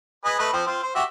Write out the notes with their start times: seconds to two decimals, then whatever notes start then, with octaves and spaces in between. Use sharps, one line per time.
0.25 G#4 B4 D#5
0.39 A3 B4 D#5
0.53 F3 C4
0.67 C4 F4
0.83 C5
0.95 F#4 G4 E5